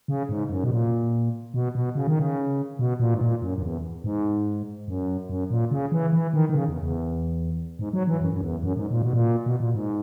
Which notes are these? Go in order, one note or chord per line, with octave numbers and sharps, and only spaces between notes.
C#3
G#2
F#2
B2
A#2
B2
B2
C#3
D#3
C#3
B2
A#2
G#2
A#2
F#2
F#2
E2
G#2
F#2
F#2
A#2
C#3
E3
E3
D#3
D#3
C#3
E2
E2
G#2
F#3
E3
F#2
F#2
E2
F#2
G#2
A#2
B2
A#2
B2
A#2
G#2